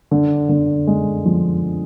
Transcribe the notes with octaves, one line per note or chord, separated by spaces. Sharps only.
D3
D3
G#3
F3